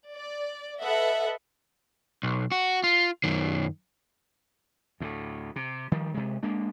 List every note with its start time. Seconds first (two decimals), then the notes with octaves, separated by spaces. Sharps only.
0.11 D5
0.80 A4 B4 D#5 E5 F#5
2.23 B1
2.52 F#4
2.84 F4
3.24 F#2 D#3
5.00 D2 A2
5.56 C3
5.92 D#3 F3 G3
6.14 C3 G#3
6.43 G#3 A#3 D4